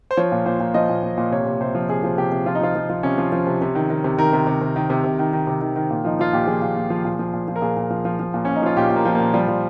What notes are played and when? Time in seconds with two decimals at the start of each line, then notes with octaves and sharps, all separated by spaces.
0.11 C5
0.17 F3 C#5
0.32 A#2
0.46 A#2 C5
0.60 A#2
0.74 F3 D#5
0.89 A#2
1.03 A#2
1.17 A#2
1.31 C3 C#5
1.46 C3
1.61 C3 C5
1.75 F3
1.89 C3 G#4
2.03 F3
2.18 C3 G4
2.32 C3
2.46 F3 F4
2.55 D#4
2.61 F3 F4
2.75 F3
2.90 F3
3.03 C3 C#4
3.18 F3
3.32 F3
3.47 C3
3.62 C3
3.75 D#3
3.90 D#3
4.04 C3
4.18 D#3 A#4
4.33 C3
4.47 C3
4.61 C3
4.76 D#3
4.90 C3
5.04 C3
5.19 D#3
5.33 D#3
5.47 C3
5.61 D#3
5.76 D#3
5.90 A#2
6.05 F3 D#4
6.19 F3 F4
6.33 A#2 G4
6.47 F3 G#4
6.62 A#2
6.76 A#2
6.90 F3
7.05 A#2
7.19 F3
7.33 A#2
7.48 F3
7.56 A#4
7.62 A#2 G#4
7.77 A#2
7.90 F3
8.05 F3
8.19 F3
8.34 A#2
8.45 A#2 C#4
8.56 D#4
8.62 F3 F4
8.77 A#2 G4
8.91 A#2
8.96 A#3
9.05 F3
9.15 A#3
9.20 A#2
9.34 F3 G3
9.48 F3